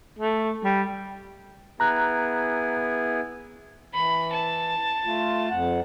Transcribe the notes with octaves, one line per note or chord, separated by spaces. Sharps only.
A3
G3
B3 E4 G#4 A#5 F#6
E3 B5
A5
A3 F4
F2 F#5